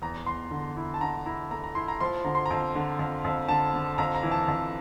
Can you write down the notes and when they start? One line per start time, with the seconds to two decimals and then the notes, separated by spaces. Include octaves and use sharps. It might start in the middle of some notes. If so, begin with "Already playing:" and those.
0.02 E2 A#5
0.26 E2 C6
0.51 D3
0.77 E4
0.94 A5
1.01 D3 A#5
1.26 E4 A#5
1.51 A3 A#5
1.64 A#5
1.75 E4 C6
1.88 A#5
2.00 F3 C6
2.25 D3 A#5
2.35 C6
2.46 F2 A#5
2.75 D3
2.99 F2
3.24 F2
3.48 D3 A5
3.74 D3
3.98 F2 A#5
4.15 A#5
4.23 E3
4.31 A5
4.48 F2